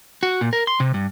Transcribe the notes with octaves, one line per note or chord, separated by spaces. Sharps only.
F#4
A#2
A#4
C6
C3
G2